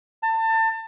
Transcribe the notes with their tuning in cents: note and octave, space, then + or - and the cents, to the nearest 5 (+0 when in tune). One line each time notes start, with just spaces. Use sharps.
A5 +30